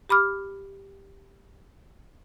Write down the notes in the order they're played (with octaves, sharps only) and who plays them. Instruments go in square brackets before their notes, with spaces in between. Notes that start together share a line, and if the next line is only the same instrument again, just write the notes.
[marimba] G4 B5 D6 F6